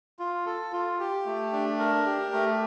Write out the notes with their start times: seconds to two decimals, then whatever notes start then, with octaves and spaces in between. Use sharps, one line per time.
0.19 F4
0.46 A4
0.72 F4
0.99 G4
1.26 A3
1.52 D4
1.79 A#4
2.06 G4
2.32 A3